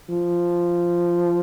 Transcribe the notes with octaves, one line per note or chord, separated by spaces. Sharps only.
F3